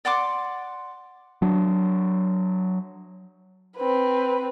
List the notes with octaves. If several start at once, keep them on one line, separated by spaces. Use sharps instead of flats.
D5 F#5 C6 D6
F#3 D4
C4 B4